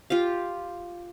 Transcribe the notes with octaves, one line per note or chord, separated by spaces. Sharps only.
F4 G4 F5